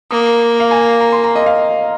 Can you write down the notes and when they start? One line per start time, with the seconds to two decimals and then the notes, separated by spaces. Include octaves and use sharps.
0.11 A#3 D#6
0.60 F5
0.71 G#5
1.01 A#5
1.12 C6
1.24 A#5
1.36 D#5
1.46 F5